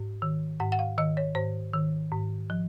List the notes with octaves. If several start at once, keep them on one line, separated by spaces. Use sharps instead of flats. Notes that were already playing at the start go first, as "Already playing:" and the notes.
Already playing: G#2
D#3
G#2 F#5
F#5
F5
D#3 D#5
C#5
G#2 C5
D#3
G#2
F3